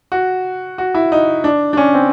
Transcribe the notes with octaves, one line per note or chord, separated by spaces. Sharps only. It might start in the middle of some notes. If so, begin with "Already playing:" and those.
F#4
F#4
E4
D#4
D4
D4
C#4
C4